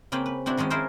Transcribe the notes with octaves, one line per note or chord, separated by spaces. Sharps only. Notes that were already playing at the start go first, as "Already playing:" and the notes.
C#3 A#3 C4 C#4 B4 G5
B4
C4 D4 E4 F#4
D#3 F3 G#3 C#4
C#4 E4 F4 G#4 A#4 C5